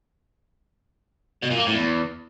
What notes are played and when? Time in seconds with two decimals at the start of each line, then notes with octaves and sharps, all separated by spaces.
1.43 B2
1.51 A#2
1.59 A#3
1.67 A2
1.74 E2